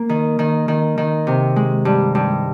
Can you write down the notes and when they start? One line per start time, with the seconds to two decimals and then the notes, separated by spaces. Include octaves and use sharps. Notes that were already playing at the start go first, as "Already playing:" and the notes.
Already playing: A#3
0.09 D#3
0.39 D#3
0.68 D#3
0.98 D#3
1.27 C3
1.56 G#3
1.85 G2
2.15 G2